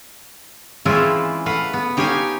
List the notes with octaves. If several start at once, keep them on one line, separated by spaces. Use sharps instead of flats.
E3 G#3 C4 C#4 E4 F4
A3 B4 F5 F#5
B3
D#4 G4 C#5 F5 G#5